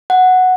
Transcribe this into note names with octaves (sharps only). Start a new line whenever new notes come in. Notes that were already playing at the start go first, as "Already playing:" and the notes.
F#5